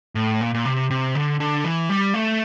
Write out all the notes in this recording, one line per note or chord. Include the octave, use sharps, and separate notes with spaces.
A2
A#2
A#2
C3
C3
D3
D3
E3
G3
A3